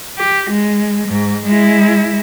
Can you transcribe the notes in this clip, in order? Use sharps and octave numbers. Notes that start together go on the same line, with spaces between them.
G4
G#3
G#2
G#3 E4